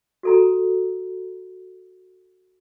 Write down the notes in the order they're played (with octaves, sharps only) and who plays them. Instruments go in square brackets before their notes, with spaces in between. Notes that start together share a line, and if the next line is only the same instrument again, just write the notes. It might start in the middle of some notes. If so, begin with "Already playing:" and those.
[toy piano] F#4 A4 A#5